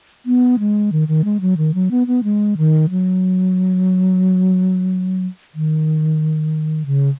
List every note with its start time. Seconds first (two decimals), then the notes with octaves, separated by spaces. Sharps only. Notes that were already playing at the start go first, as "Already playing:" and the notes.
0.26 B3
0.59 G#3
0.92 D#3
1.08 D#3
1.24 G#3
1.41 F#3
1.57 D#3
1.74 F#3
1.91 B3
2.07 B3
2.24 G#3
2.57 D#3
2.90 F#3
5.55 D#3
6.86 C#3